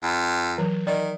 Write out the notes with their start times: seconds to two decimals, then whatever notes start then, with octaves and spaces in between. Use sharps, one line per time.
0.03 F2
0.58 E3 F#3
0.87 D#3 D5 D#5